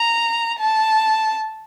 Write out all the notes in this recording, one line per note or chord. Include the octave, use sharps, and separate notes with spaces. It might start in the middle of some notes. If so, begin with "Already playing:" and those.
Already playing: A#5
A5